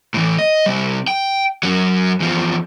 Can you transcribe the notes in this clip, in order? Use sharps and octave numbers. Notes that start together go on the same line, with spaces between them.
A2 E3
D#5
C3 G3
G5
F#2 F#3
E2 F3